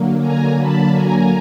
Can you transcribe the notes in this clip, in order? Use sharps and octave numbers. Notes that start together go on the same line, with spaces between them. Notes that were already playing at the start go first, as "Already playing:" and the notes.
Already playing: D3 F#3 A#3
G#5 A#5
A5 B5
G#5 A#5